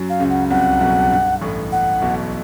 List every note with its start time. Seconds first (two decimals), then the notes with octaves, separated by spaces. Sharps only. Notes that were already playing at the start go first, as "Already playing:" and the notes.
Already playing: F#2 F#3
0.10 F5
0.20 C#2 C#3
0.30 F#5
0.50 C2 C3 F#5
0.81 B1 B2
1.11 G2
1.41 A1 A2
1.72 F#5
2.02 B1 B2